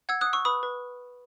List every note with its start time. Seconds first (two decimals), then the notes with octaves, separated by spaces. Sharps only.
0.09 F#5 E6 G#6
0.21 D#6 F#6
0.27 F#5
0.33 C#6 E6
0.45 B4 B5 D#6
0.63 B4